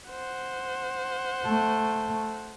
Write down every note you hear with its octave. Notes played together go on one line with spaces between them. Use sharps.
C5 F#5
A3